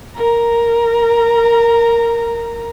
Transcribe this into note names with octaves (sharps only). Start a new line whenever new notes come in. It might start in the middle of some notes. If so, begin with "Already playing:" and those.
A#4 A#5